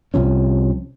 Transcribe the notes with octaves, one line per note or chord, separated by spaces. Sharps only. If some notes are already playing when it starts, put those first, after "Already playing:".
C2 C3 F3 C#4